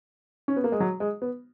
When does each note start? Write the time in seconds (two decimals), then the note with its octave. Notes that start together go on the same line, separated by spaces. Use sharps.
0.48 C#4
0.56 B3
0.64 A#3
0.72 G#3
0.80 F#3
1.00 G#3
1.22 B3